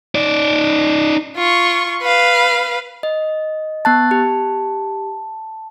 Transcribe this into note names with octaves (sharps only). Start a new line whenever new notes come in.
D#4 D5
F4 C#6
B4 F5
D#5
B3 A5 F#6 A6
G4